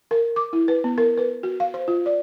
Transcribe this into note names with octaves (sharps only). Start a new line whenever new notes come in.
A#4
D6
E4
B4
B3
A#4
B4
F#4
F5
C5
F4
D5